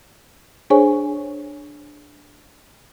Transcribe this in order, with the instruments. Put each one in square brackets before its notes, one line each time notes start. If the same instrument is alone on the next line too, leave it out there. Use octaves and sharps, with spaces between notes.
[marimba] D4 G#4 C5 C#5 G#5 C#6